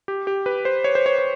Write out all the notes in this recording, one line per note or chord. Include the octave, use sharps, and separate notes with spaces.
G4
G4
B4
C5
C#5
C5
C#5
C#5